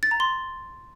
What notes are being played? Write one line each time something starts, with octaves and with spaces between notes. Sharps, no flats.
A6
A#5
C6